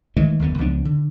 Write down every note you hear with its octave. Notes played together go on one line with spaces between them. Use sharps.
D#3 E3 G#3 A3
F#1 D#2 D3 B3
C#2 F3 B3 D4
D3